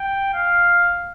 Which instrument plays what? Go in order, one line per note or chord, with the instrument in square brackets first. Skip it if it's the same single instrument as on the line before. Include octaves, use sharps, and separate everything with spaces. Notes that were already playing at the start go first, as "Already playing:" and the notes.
Already playing: [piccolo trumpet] G5
F5